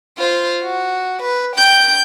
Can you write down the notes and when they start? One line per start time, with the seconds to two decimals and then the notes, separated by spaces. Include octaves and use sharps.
0.18 F4 C5
0.63 F#4
1.22 B4
1.56 G5 G6